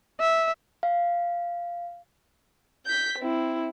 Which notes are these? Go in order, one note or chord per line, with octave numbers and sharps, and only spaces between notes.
E5
F5
G6 B6
C4 E4